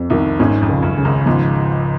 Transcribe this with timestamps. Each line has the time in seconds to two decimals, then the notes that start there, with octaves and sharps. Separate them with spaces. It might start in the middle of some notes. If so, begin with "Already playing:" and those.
Already playing: F2
0.10 C2 C3 D#3
0.40 G#1 G#2 C#4
0.61 F2
0.69 C#2
0.82 F#2
0.97 C#3
1.05 G#1 G#2
1.26 G#1 G#2 F3